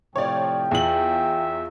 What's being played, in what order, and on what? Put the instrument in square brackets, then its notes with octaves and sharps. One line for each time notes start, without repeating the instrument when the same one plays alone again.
[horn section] A2 C3 F3 [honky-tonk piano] C#5 D5 [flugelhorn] G5
[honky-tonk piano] E2 F#7 [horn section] F4 E5